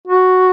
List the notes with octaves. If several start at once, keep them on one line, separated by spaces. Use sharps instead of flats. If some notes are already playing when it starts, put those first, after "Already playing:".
F#4